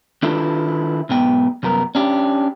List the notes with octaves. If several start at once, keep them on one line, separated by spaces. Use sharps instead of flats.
D#3 D4 E4 F4 A4 B4
B1 G#2 B3 G5
C2 F#2 B3 A#4
C#4 D4 G4